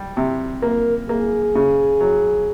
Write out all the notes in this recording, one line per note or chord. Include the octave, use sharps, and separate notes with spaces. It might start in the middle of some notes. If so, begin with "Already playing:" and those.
Already playing: G3
C3
A#3 A#4
A#3 G#4
C#3
F#3